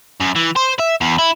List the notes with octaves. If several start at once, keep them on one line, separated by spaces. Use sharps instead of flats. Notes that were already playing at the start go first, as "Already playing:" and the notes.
F#2
E3
C5
E5
E2
E4